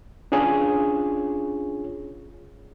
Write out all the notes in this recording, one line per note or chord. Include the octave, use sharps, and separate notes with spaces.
C#4 D4 F4 G#4 C#5